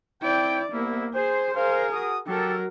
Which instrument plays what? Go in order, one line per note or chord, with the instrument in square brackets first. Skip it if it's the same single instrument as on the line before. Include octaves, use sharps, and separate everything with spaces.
[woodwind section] C4 G5 [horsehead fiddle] E4 D5
[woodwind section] C2 B3 E4 [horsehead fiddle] A#3
[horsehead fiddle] G#4 [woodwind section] C5
[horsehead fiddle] G#4 A#4 [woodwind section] C5 F5
[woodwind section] F#4 D#6
[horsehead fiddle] F#3 A#4 [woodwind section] G4 A4